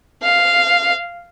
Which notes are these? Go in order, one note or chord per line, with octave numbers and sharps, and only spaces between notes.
F5